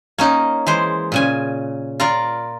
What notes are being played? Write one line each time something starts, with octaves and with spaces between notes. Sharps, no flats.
A#3 C#4 D#4
E3 G#3 C5
A#2 C#3 G#5
F4 A#4 D5